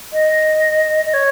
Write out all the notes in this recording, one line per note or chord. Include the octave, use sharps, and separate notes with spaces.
D#5
D#5
C#5